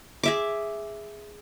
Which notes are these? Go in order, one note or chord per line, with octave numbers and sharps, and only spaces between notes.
G#4 E5 D6